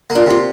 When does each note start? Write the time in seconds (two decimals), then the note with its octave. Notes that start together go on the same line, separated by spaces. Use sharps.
0.10 A#3
0.15 D4 F4
0.26 C3 F4